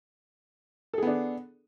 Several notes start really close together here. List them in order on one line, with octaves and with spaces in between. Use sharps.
A4 G#4 B3 D4